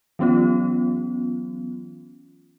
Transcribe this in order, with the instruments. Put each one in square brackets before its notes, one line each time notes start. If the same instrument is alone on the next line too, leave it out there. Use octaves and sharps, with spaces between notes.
[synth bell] E3 F#3 B3 C#4 F4